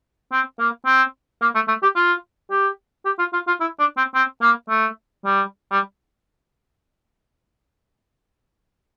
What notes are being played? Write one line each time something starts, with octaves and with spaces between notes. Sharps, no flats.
C4
A#3
C4
A#3
A3
A3
G4
F4
G4
G4
F4
F4
F4
E4
D4
C4
C4
A#3
A3
G3
G3